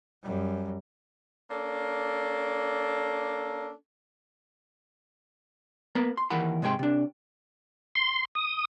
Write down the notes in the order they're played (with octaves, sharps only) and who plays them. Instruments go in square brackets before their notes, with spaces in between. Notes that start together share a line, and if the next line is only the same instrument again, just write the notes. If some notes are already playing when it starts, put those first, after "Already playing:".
[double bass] F#2 G3
[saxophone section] A#3 C#4 D4 A4
[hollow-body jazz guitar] A#3 B3 A#4 B4 A#5
C6
D#2 E3 A#4 F#5 B5
G#2 C3 G#3 C#5 G5 C6
C3 D4
[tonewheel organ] C6
D#6